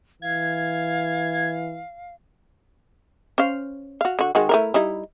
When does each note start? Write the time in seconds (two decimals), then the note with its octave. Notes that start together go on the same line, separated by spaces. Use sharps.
0.22 E3 F5 G#6
3.38 C#4 C5 F5
4.01 F#4 F5
4.19 D3 F#4
4.35 D#3 G#3 F#4
4.49 A3 E4 A#4
4.74 G3 D#4 E4